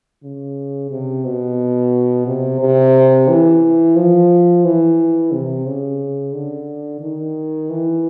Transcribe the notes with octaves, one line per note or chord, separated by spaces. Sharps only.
C#3
C3
B2
C3
C3
E3
F3
E3
C3
C#3
D3
D#3
E3